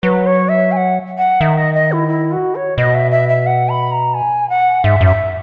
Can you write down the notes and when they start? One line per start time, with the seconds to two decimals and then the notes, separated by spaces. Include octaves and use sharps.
0.03 F#3 B4
0.26 C#5
0.49 E5
0.72 G#5
0.77 F#5
1.18 F#5
1.41 D#3 E5
1.58 D#5
1.75 D#5
1.92 E4
2.08 E4
2.32 F#4
2.55 C#5
2.77 B2 D#5
2.94 E5
3.11 E5
3.29 E5
3.46 F#5
3.69 B5
3.92 A#5
4.14 G#5
4.50 F#5
4.84 G#2 E5
5.01 F#2
5.06 E5